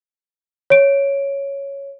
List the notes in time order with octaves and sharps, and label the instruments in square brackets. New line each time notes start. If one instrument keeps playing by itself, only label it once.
[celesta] C#5 D7